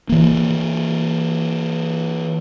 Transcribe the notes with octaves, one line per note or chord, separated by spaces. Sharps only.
E3 A#3